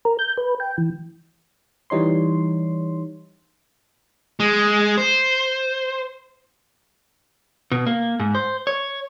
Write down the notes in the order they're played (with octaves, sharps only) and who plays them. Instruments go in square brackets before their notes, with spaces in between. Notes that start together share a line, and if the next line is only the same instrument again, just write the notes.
[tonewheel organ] A#4
G6
B4
G5
E3
[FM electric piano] E3 G3 D#4 C#5 C6
[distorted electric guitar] G#3
C5
[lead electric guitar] B2
A#3
G#2
C5
C#5